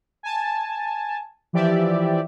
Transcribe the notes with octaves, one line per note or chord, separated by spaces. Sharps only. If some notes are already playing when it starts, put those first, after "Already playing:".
G#5 A5
E3 F3 G4 D5 E5